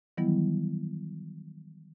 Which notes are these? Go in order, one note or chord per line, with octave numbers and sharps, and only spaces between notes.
D#3 E3 F#3 G3 B3 E4